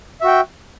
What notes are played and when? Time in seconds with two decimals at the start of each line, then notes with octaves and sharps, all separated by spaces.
0.21 E5
0.24 F#4
0.27 G5